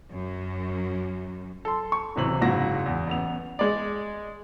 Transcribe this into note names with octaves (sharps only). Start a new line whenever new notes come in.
F#2
A4 C6
C#6
D1 A1 C3 E3 F#7
F#1 G#2 E4 F#4 A#6
E2
A1 B3 F7
G#3 D5